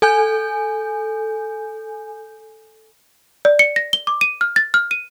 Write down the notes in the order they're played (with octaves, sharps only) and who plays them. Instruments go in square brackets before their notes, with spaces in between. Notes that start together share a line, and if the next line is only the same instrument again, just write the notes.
[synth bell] A4 G#5 G6
[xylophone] D5
C#7
A#6
G7
D6
D#7
F6
A6
F6
D#7